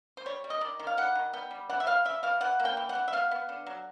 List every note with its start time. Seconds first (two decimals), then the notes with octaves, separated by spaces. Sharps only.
0.17 C5
0.26 G3 C#5
0.44 G3
0.50 D#5
0.61 D#3 D5
0.79 D#3
0.87 F5
0.97 G3 F#5
1.15 D#3
1.33 B3 G5
1.51 G3
1.70 E3 F#5
1.80 E5
1.86 E3 F5
2.05 E3 E5
2.23 E3 F5
2.41 E3 F#5
2.60 A#3
2.65 G5
2.77 E3
2.89 F#5
2.95 E3
3.08 E5
3.13 B3 F5
3.31 B3
3.49 D3
3.66 F#3